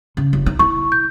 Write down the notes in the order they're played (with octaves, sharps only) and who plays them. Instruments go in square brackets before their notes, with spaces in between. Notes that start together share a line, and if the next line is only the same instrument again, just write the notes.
[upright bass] C#3
F#1
D#4
[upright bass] E4 [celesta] C#6
[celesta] G6